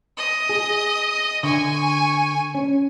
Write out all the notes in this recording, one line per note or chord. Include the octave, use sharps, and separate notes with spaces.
D#5
G#4
D3 G#5 C#6
C#4